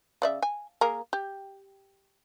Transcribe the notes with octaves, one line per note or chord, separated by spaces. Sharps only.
C#3 D5 E5
G#5
A#3 G#4 A#4
G4